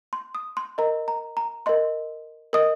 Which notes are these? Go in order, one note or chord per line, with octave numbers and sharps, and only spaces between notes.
C6
D#6
C6
A#4 D#5 A#5
A#5
A#5
A#4 D#5 C6
A#4 D#5 D#6